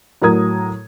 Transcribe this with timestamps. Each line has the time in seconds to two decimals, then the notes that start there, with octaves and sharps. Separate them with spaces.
0.22 A2 F#3 A#4 A#5 D#6 G#6